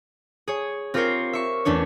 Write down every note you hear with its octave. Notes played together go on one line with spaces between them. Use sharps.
G#4 C#5
C4 F4 G4 A#4 C5 C#5
E5 C#6
E2 A3 C#4 D4 C#5